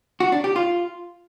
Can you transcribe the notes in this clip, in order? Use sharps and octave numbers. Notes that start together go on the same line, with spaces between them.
F#4
D4
G4
F4